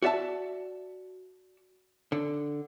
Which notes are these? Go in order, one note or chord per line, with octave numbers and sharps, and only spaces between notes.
F#4 D5 E5 A5
D3